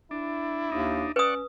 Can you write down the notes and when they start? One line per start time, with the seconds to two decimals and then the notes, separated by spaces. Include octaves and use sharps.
0.11 D4 E4
0.72 D#2 D4 D#4
1.16 C#4 B4 D5 F#5 C#6 D#6